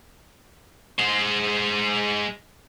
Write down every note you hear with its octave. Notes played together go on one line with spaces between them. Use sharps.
G#3 C5